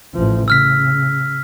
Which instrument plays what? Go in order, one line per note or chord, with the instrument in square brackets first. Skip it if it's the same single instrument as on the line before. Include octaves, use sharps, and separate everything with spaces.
[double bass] A1 F3
[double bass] C#3 [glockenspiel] E6 F6 B6